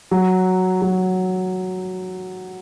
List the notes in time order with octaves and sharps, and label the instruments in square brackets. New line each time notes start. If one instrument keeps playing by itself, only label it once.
[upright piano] F#3
F#3